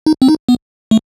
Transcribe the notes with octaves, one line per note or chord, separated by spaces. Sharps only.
D#4
C4
D#4
B3
A3